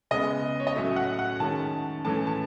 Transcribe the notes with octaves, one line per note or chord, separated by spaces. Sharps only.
C#3 G#3 B3 D#5
C#5
D#5
A2 F#3 A3 C#4 E5
F#5
F#5
D#3 G#3 C#4 A5
A2 E3 A3 C#4 A5
A5